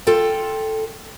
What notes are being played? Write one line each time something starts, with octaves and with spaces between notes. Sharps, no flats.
F4 A4 G5